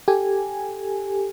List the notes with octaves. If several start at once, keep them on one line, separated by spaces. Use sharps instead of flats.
G4 A4 G#5